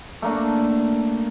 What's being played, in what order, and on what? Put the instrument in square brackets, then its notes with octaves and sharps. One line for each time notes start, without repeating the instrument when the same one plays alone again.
[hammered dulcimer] A3 A#3 D4